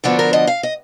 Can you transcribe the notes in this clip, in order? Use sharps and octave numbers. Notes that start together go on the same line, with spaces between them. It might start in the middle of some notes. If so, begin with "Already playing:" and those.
D2 D3 F3 B3 D4 F#4
A#4
D#5
F5
D#5